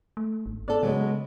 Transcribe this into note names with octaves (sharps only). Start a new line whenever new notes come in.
A3
G#1
B3 A4 D5
C#3 F#3 G#3 B3